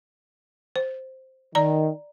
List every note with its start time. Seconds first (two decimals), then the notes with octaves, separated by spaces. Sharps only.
0.76 C5
1.55 D#3 D5 A#5